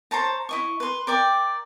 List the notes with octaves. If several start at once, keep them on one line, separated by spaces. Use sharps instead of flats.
C5 C#5 A5 A#5
E4 D#5 C#6
B4 C6
A#4 D5 G5